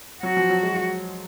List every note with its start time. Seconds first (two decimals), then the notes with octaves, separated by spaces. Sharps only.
0.23 F#3 F#4
0.37 F3
0.50 F#3
0.63 G#3